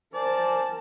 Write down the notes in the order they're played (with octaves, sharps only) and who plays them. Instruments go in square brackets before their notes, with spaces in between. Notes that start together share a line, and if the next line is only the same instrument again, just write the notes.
[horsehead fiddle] A#4 A5 [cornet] C5 [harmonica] D5 [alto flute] G#5